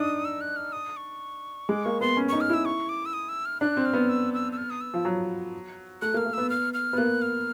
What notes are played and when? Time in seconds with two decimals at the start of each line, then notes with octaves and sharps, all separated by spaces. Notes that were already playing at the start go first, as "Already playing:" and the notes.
Already playing: D4 D#4 D#6
0.25 E6
0.41 F#6
0.56 F6
0.73 D#6
0.97 C#6
1.69 G#3 D6
1.84 A#3 C#6
2.01 B3 C6
2.17 C#4
2.29 D#4 C#6
2.41 F6
2.50 E4 E6
2.65 C#6
2.89 D6
3.06 E6
3.13 D#6
3.29 E6
3.46 F6
3.61 D4 F#6
3.77 C4
3.86 F6
3.93 B3
4.09 E6
4.34 E6
4.52 E6
4.58 F6
4.70 D#6
4.81 E6
4.94 F3
5.05 F#3
6.02 A3 F#6
6.14 A#3
6.17 F6
6.26 A#3
6.33 B3 E6
6.50 F6
6.74 F6
6.93 B3
6.98 A#3 F#6
7.22 F6